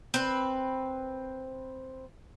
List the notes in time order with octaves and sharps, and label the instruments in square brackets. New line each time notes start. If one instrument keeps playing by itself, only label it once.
[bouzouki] C4 B4